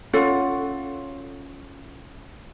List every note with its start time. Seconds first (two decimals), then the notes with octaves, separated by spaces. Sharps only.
0.13 C#4 F4 A4 F#5